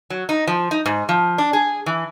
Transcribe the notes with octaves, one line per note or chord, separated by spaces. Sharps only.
F#3
D#4
F3
D#4
G#2
F3
D4
G#4
E3